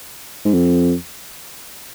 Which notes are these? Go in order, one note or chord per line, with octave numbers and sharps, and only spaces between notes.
G#2
F2